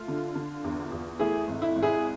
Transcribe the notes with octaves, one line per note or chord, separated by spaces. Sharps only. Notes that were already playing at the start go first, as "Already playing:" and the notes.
Already playing: A3 F4
D3
D3
E2
E2
A3 E4 G#4
G#1
E4
G#1
E4 G#4